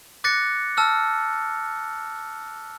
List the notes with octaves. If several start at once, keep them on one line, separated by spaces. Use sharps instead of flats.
D6 F#6 A6 A#6 C#7
A5 E6 F6